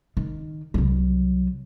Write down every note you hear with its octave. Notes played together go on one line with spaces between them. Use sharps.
D#3
C2 F#3